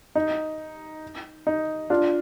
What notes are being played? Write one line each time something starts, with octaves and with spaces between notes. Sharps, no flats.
D#4
D#4
D4 F4